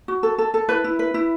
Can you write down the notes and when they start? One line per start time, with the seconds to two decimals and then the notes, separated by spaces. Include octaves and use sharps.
0.08 F#4
0.23 A4
0.38 A4
0.54 A4
0.69 E4 B4
0.84 E4
0.99 B4
1.14 E4